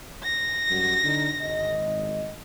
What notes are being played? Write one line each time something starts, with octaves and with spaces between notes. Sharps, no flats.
A#6
F#2 G3 F#4
D3 D4 D#4
G#1 D#5